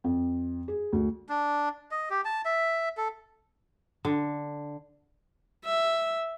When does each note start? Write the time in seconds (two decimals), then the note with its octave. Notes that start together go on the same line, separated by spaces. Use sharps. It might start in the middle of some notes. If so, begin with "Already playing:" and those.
0.04 F2
0.68 G#4
0.93 D2
1.29 D4
1.91 D#5
2.10 G4
2.25 A5
2.45 E5
2.97 A4
4.05 D3
5.65 E5